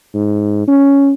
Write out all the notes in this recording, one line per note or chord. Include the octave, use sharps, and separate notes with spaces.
G#2
C#4